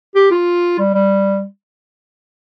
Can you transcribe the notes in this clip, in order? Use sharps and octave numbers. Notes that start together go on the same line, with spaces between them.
G4
F4
G3
G3